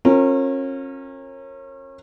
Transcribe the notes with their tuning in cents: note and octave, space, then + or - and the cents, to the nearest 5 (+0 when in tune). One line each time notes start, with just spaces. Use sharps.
C#4 -35 F4 +45 A#4 -20